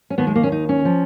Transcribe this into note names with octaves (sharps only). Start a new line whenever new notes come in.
C#4
D#2 D#3 B3
G#3
A#3
C#4
D#4
C#4
F3